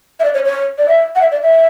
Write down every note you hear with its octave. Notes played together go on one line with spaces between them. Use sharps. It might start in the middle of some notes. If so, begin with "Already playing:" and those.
E5
D5
C#5
C#5
D5
E5
F#5
E5
D5
E5